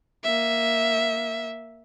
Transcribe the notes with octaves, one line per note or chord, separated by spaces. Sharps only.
A#3 E5